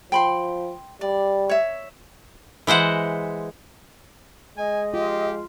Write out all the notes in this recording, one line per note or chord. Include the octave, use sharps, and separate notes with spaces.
F3 G5 B5 C6
G3 D5
C#5 E5
E3 G#3 C5 F#5
G#3 D#5 G#5
F4 G4